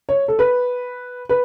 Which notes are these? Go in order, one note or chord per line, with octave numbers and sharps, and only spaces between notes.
C#5
A4
B4
B4